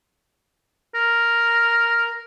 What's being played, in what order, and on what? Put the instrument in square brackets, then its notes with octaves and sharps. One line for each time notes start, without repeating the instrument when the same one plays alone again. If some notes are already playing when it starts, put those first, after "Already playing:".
[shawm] A#4